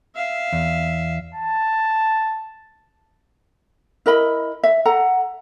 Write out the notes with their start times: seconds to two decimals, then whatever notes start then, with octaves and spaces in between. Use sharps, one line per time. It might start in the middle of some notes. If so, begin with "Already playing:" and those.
0.15 E5 F5
0.53 E2
1.34 A5
4.06 E4 A#4 D#5 B5
4.63 E5
4.85 A4 F#5 A#5